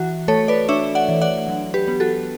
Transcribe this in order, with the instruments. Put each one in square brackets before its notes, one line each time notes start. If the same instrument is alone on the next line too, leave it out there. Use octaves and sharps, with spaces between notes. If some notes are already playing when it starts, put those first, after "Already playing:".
Already playing: [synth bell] E3 F#4
A3 A4 C#5
B4 D5
D4 C#5 E5
D5 F#5
E3
D5 F#5
F#3
G4 B4
B3
F#4 A4